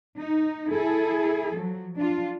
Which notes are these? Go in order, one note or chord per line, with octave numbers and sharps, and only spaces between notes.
D#4
E4 G#4 A4
F3 F#3
D4 F4